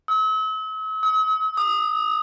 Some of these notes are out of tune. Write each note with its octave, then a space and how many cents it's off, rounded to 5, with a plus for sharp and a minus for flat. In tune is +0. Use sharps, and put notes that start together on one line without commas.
E6 -45
D#6 +45
D#6 -30